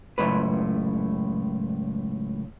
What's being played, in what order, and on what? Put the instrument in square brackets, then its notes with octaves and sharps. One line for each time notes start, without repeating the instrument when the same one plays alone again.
[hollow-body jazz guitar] C#2 F#2 A2 B4